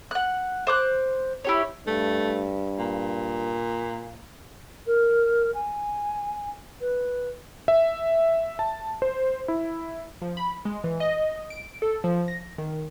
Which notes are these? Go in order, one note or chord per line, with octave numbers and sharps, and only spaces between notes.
F#5 F#6
C5 D6 F#6
E4 G4 C#5
G2 A3
A#2
A#4
G#5
B4
E5
A5
C5
E4
F3
B5
G#3
E3
D#5
D7
A4
F3
A#6
D#3